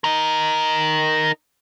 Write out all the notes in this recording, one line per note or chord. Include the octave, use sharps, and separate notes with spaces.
D#4 A#4